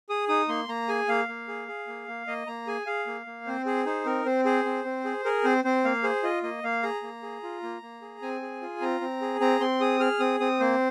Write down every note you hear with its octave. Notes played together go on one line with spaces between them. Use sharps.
G#4 D#6
D#4 D#6
A#3 C6
A#3 A#5
G#4 G#5
A#3 F5
A#3
G#4
G#4
A#3
A#3
A#3 D#5
A#3 A#5
G#4 G#5
G#4 F5
A#3
A#3
C4 C5
G#4 C5
D#4 C5
C4 A#4
C4 C5
G#4 C5
C4
C4
G#4
G#4 A#4
C4 C5
C4 C5
A#3 F5
G#4 C5
F4 D#5
A#3 D#5
A#3 F5
G#4 A#5
A#3
G#4
F4
A#3
A#3
G#4
C4 G#5
G#4
F4
C4 A#5
C4
G#4
C4 A#5
C4 C6
G#4 D#6
G#4 F6
C4 D#6
C4 D#6
A#3 C5